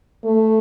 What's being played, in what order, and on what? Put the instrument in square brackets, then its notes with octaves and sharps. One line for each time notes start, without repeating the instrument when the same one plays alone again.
[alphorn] A3